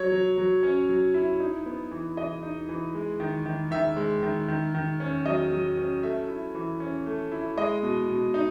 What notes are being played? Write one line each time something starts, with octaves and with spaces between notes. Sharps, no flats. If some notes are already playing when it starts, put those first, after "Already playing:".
Already playing: F#3 C#5
F#3
F#3
C#4
F#3
E4
D#4
B3
E3
E3 D#5
D#4
E3
G#3
D#3
D#3
D#3 E5
G#3
D#3
D#3
D#3
C#4
F#3 D#5
F#3
C#4
A3 E5
E4
E3
C#4
A3
E4
G#3 D#5
B2
B2
D#4